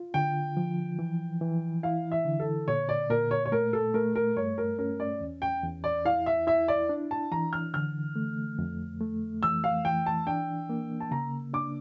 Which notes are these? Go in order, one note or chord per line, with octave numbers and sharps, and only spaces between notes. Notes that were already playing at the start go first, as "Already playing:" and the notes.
Already playing: F4
D3 G5
F3
E3
E3
E4 F5
E5
D3
A4
A#2 C#5
D5
A#2 A#4
C#5
C#5
A3 A#4
A4
A3 A#4
A#4
G2 C#5
A#4
C#4 A#4
D5
E2
G5
E2
D5
E4 F5
E5
E4 E5
D5
D4
A5
E3 A#5
F6
D3 F6
A3
F2
A3
E3 E6
F5
E3 G5
A5
D4 G5
A#3
A5
C#3 A#5
D4 D6